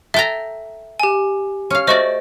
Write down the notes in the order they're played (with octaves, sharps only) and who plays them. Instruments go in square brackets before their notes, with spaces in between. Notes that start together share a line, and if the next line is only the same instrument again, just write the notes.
[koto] A4 G5 A#5 [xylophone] E5
[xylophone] G4 G#5
[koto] C#4 F5
[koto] A3 F#4 D5 [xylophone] C5 D#5 C#6